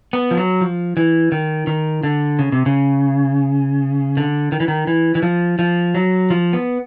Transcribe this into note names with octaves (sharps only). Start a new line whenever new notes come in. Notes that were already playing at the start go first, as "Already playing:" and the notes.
B3
F3
F#3
F3
E3
D#3
D#3
D3
C#3
C3
C#3
D3
D#3
E3
D#3
E3
E3
F3
F3
F#3
F3
B3